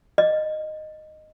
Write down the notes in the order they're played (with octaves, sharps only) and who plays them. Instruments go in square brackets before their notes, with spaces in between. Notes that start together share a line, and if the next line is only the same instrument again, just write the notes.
[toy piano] D#5